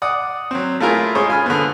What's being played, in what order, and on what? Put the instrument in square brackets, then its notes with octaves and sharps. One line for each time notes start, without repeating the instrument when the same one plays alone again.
[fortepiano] D5 F#5 D#6
F#3 C4
A3 E4 F4 G#4 A#4
G#3 C#4 C5 C#6 D#6
F4 G#5 B5 F6
D3 B3